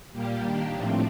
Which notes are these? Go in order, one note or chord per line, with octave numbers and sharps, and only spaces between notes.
A#2 G3 A#3 G4
D#3 A#3 D4
A2 F3 A3 C4